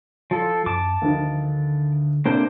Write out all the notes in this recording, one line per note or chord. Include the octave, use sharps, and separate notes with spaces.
F3 A4
F#2 A5 D6
D2 D3 D#3 F3
A2 C3 A#3 D4 C5